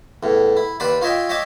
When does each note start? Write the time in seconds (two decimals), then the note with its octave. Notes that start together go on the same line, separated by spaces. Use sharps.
0.23 E2 A2
0.57 E4
0.80 D#2 B4 C5 D5 B5
1.02 F4 C#5 D#5 E5 G5
1.29 C#5 D#5 E5 G5 D6